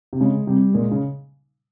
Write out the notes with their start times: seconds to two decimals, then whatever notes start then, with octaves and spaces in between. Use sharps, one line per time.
0.13 C3
0.20 C#3 G#3
0.47 C3 G3
0.74 A#2 G#3
0.91 C#3